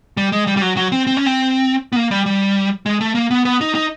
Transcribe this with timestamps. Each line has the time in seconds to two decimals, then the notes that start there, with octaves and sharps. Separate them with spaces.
0.17 G3
0.32 G#3
0.47 G3
0.57 G3
0.61 F#3
0.77 F#3
0.92 C4
1.07 C4
1.17 C#4
1.26 C4
1.92 B3
1.96 A#3
2.11 G3
2.26 G3
2.86 G#3
3.01 A3
3.15 A#3
3.31 B3
3.45 B3
3.61 D#4
3.75 D#4